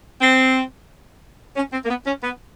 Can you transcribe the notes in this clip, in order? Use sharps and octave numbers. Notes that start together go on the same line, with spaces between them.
C4
C#4
C4
A#3
B3
C#4
B3